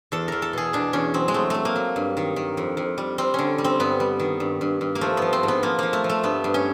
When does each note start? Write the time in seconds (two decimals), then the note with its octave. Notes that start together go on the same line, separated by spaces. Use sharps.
0.12 E2 A4
0.28 E2 A#4
0.42 A4
0.53 B2 G#4
0.73 B2 D4
0.93 E2 C#4
1.14 F#3 C4
1.28 G#3
1.34 F#3 A3
1.50 F#3 A3
1.65 A#3
1.76 F#3
1.96 G2
2.17 D#3
2.36 D#3
2.57 F2
2.77 F2
2.98 G3
3.18 G3 C4
3.34 D3 C#4
3.58 G3
3.64 C4
3.80 G2 B3
4.00 G3
4.20 D#3
4.40 G2
4.61 G2
4.81 G2
4.95 A#3
5.01 F3 A3
5.17 F3 B3
5.33 C4
5.43 G#2
5.48 B3
5.63 F3 A#3
5.79 F3 A#3
5.93 A3
6.04 F3
6.09 A3
6.23 G2 B3
6.44 G2
6.54 C#4